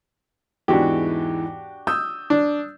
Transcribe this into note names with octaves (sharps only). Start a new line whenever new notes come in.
E2 G#2 E3 D4 F#4 G4
D#6 E6 G6
D4